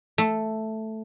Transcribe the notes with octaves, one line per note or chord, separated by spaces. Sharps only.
A3